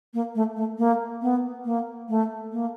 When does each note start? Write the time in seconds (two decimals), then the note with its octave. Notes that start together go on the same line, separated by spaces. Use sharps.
0.14 A#3
0.35 A3
0.56 A3
0.78 A#3
1.22 B3
1.65 A#3
2.09 A3
2.52 A#3